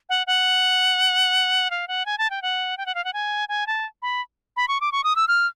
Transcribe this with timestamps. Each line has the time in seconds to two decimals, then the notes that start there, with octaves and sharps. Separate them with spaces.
0.09 F#5
0.27 F#5
1.71 F5
1.88 F#5
2.06 G#5
2.18 A5
2.30 G5
2.42 F#5
2.77 G5
2.86 F#5
2.95 F5
3.05 F#5
3.13 G#5
3.49 G#5
3.67 A5
4.02 B5
4.57 B5
4.68 C#6
4.81 D6
4.92 C#6
5.04 D#6
5.16 E6
5.28 F6